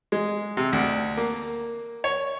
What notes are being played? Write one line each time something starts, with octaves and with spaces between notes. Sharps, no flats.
G#3
C3
D2
A#3
C#5